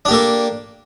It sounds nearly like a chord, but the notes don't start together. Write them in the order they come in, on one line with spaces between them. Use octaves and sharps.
D4 G4 A#3 A4